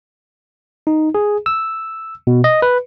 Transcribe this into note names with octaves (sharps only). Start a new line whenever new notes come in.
D#4
G#4
E6
B2
D#5
B4